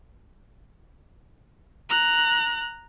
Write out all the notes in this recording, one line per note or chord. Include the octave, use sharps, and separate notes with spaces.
A#5 F#6